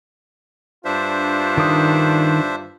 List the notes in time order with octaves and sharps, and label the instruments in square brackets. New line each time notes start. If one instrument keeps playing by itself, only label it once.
[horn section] G2 F4 [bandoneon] D4 C5 E5
[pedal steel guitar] D#3 D#6